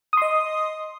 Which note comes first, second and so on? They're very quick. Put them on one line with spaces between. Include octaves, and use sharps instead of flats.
D#6 C6 D#5